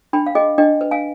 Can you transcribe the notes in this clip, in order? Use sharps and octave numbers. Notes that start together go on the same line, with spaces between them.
D4 G5 B5
F5
G#4 D#5 G5
D4 D#5 G5
B4
F5 G#5